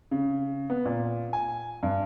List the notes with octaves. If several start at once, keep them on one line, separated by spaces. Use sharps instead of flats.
C#3
B3
A#2
G#5
G2